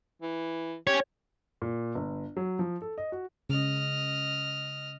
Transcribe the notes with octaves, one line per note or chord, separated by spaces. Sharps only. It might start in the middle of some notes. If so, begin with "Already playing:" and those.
E3
C#4 G4 C#5
A#2
G1
F#3
F3
A4
D#5
F#4
C#3 D#5 F6